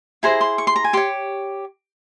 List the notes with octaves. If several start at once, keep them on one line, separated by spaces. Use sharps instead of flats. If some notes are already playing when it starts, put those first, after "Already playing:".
E4 G#4 C5 A#5
C6
C#6
C6
A#5
G#5
G4 C#5 C6